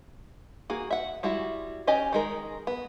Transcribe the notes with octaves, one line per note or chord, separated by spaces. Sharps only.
A#3 F#4 G#4
E5 F#5
G3 G#3 E4 F#4
C#4 G4 D#5 G#5
D#3 G#3 A#4
B3